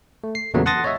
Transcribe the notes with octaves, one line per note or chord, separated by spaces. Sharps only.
A3
C7
E2 A#2 C#3 F#3 A3 B3
F#5 A5 C6 D#6 A6 A#6
C#5 D#5 E5